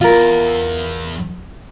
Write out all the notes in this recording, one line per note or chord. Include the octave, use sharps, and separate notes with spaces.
E2 F4 A#4